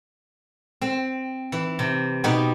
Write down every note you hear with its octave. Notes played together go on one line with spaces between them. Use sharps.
C4
E3
C3
B2 B3 D#4 F#4 G4 B4